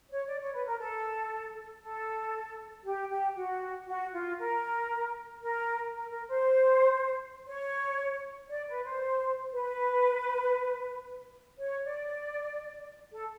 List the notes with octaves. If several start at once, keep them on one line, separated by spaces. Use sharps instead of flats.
C#5
D5
C#5
B4
A#4
A4
A4
G4
G4
F#4
F#4
F4
A#4
A#4
A#4
A#4
C5
C#5
D5
B4
C5
B4
C#5
D5
A4